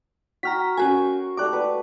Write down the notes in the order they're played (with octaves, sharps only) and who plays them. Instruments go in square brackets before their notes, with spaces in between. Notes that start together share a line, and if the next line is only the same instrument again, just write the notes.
[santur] F#4 G5 [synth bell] A#5 F6 B6
[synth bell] C#4 F#4 G#5 [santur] A#4 F#5
[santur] G3 A3 A#5 [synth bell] D6 F#6
[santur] F#4 B4